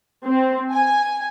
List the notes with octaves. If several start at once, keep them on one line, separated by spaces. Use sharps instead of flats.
C4
G#5